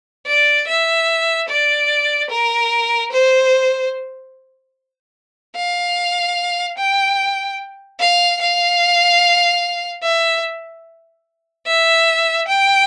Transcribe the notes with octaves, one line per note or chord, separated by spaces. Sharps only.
D5
E5
D5
A#4
C5
F5
G5
F5
F5
E5
E5
G5